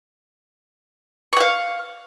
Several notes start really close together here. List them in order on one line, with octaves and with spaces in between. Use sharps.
C#6 F#5 F5